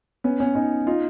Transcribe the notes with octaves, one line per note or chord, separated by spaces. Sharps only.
B3 C#4
B3 C#4
C#4 D#4
D#4 F4